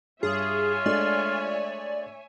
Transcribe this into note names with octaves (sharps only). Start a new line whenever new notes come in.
G2 F4 G#4 C#5 E5 G#5
G#3 A3 D4 D5